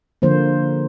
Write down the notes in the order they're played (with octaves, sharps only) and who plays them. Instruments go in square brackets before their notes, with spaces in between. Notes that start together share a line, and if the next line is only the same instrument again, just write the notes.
[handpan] D3 F3 A#3 C5